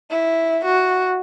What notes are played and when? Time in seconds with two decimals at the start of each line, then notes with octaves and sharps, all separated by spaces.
0.10 E4
0.65 F#4